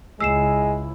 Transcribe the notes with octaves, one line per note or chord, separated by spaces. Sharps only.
C#2 G#3 E4 E6 C7 E7